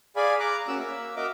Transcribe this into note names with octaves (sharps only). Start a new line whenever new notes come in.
G#4 D5 F5 G#5 B5
A#5 D6 F#6
A#3 C#4 F#4 E6
A#3 E5
F#4 A#4 D#5 E5 D6